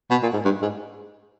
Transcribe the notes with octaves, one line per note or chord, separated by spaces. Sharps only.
B2
A#2
G#2
G2
G#2